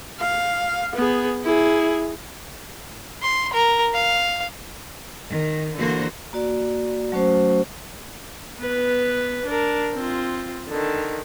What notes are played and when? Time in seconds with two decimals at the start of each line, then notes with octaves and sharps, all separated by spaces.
0.20 F5
0.95 B3 G#4
1.44 E4 G#4
3.22 C6
3.53 A#4
3.94 F5
5.30 D#3
5.78 D3 E3 A#3 F#4 C5
6.33 A#3 F#4 D5
7.12 F#3 A3 C#4 F#4 C5
8.58 B3 B4
9.46 D4 A#4
9.94 C4 F4
10.69 D3 D#3